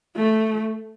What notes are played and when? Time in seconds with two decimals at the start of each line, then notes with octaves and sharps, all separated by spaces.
0.16 A3